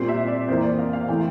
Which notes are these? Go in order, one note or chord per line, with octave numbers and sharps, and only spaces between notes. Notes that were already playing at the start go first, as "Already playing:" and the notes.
Already playing: A#2 G3 C4 C6
E5
D5
F2 E3 A#3 C5
D5
F5
F5
E3 A3 C4 G5